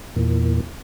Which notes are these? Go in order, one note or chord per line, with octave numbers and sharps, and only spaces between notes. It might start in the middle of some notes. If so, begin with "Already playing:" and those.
E2 A#2